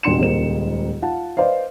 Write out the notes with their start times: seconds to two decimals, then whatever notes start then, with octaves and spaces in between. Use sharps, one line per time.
0.03 D#1 B2 D4 C6 C#7 E7
0.19 D#1 C#2 G#3 A#3 C5 E7
1.02 F4 F#5 A5
1.37 B4 C5 D5 D#5 F5